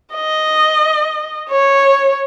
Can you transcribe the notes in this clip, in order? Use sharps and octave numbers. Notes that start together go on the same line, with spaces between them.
D#5
C#5